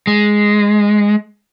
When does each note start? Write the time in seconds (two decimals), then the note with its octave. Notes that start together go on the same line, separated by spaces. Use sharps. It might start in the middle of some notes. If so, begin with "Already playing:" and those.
0.07 G#3